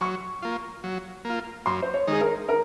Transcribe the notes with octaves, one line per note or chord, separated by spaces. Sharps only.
F#3 C#6
A#3 F4
F#3
A#3 F4
F#2 C6
C5
C#5
D#3 G#3 D#4 G#4
A#4
A#4